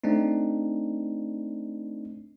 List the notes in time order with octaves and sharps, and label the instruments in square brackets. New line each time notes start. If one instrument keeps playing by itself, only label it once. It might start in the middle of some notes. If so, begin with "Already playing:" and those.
[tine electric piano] A3 C4 D4 D#4